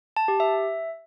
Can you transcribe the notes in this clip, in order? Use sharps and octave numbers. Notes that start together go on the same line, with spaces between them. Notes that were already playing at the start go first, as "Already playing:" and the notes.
A5
G4
E5